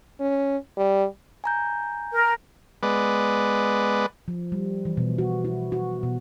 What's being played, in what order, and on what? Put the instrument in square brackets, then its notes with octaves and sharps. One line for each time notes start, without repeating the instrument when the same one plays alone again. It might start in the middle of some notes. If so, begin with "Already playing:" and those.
[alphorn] C#4
G3
[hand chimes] G#5 A#5 G6
[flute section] A#4
[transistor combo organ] G#3 B3 B4 D5
[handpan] F3
G3
E3
B2
F#4
E4
F#4
B2